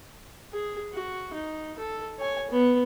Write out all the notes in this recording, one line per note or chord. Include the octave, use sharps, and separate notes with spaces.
G#4
F#4
D#4
A4
C#5 G#5
B3